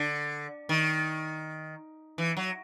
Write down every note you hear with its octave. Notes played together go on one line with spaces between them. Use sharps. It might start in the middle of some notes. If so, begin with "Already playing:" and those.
Already playing: D3
D#3
E3
F#3